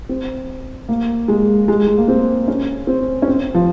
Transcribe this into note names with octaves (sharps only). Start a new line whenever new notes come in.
C4
A#3
G#3
G#3
G#3
A#3
C4
C#4
C4
C#4
C4
F3